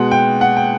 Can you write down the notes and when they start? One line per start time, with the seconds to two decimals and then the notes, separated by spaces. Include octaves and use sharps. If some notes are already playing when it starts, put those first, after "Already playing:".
Already playing: B2 G#3 F#5
0.11 G5
0.41 F#5
0.57 G5